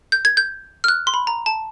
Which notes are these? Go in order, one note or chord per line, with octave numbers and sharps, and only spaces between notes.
G6
G#6
G6
F6
F#6
C6
B5
A#5
A5